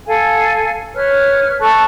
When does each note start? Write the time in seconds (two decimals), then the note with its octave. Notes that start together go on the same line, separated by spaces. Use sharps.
0.07 A4 F5 G#5
0.94 B4 C#5 F6
1.60 A4 A5 C#6 F#6